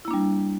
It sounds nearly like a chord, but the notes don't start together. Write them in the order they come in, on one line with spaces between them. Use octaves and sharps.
E4 A#3 D4 G3